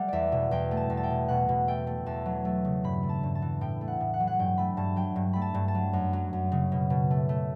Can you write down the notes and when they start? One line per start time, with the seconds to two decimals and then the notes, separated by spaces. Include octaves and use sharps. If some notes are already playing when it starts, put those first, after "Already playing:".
Already playing: G3 A3 F#5
0.08 E2 D5 E5
0.32 B2
0.51 E2 G5
0.71 A3
0.77 A5
0.90 E2
0.97 A5
1.04 G5
1.10 B2
1.28 B2 F#5
1.49 B2
1.68 A3 G5
1.87 A3
2.06 E2 A5
2.26 F#3
2.45 A3
2.65 C#3
2.84 G2 B5
3.03 A3
3.09 A5
3.23 G2
3.35 A5
3.42 E3
3.61 A2 G5
3.81 A3
3.88 F#5
4.00 A2
4.14 F#5
4.20 F#3
4.27 F#5
4.39 G2 G5
4.58 A3 B5
4.77 G2 A5
4.96 F#3 G5
5.16 G2
5.33 A3 B5
5.42 A5
5.54 G2
5.68 A5
5.75 F#3
5.93 F#2
6.13 F#3
6.33 F#2
6.52 C#3
6.72 B2
6.90 B2
7.10 A3
7.29 A3